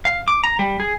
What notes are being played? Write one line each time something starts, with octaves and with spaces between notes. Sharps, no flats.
F5
D6
A#5
G3
G#4